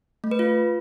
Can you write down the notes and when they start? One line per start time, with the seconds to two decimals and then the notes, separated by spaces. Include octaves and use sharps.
0.24 A3
0.31 B4
0.39 F4